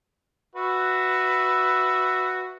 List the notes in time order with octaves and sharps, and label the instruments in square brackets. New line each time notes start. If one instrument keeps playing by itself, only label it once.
[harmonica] F#4 B4 E5